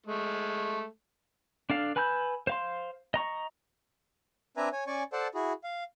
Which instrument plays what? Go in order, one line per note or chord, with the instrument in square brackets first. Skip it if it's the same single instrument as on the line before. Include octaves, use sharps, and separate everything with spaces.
[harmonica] G#3 A3
[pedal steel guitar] D4 A4 F5
B4 G#5 B5 E6 G6
C5 F5 C6
D#5 A#5 C#6
[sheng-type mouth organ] C4 D4 B4 E5 G#5 A#5
C#5 G#5
C#4 D5 G#5 C#6
A4 C5 D5 F#5 A5
E4 F#4 G#4
F5